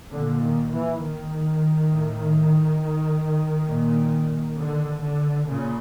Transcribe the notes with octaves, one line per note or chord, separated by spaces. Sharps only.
A#2 D3
D#3
E3
D#3
A2
A#2
D3
D3
A#2 C#3